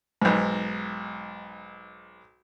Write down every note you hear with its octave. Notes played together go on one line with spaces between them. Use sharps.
B1 G#2